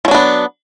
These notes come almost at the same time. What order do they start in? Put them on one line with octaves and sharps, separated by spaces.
F3 F#3 D4 B3